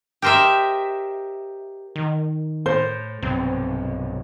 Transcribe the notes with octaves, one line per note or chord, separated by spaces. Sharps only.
G4 A#4 C5 D#5 E5
D#3
A2 C5
B1 G2 C3 C4